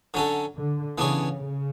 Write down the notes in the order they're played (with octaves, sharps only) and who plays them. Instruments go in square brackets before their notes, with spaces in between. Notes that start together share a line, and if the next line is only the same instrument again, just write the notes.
[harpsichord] D3 F#3 C#4 F#4 A4
[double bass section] D3
[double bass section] C#3 [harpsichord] E3 B3 D4 G#4 C#5
[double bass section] C#3